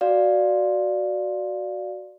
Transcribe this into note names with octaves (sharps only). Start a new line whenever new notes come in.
F#4 D5 F5